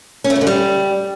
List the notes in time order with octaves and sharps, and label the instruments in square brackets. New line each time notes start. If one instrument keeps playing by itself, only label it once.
[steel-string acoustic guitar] C#4
A3
C#3
D3
G3